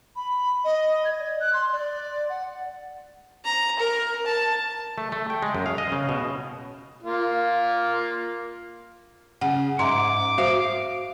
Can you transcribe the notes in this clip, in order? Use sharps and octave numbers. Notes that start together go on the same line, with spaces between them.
B5
D#5
G#6
D5
F#6
C6
D5
F#5
A#5
A#4
A5
A3
A3
G5
G#3
F#2
F5
D#5
C#3
B2
A#3 F4
C#3 F#5
G#2 E5 A#5 C6 D6
F#4 C5 E5 F5